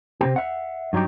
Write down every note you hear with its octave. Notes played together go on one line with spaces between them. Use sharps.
C3 C4 G4
E5 F#5
G2 F#3 D#4 G4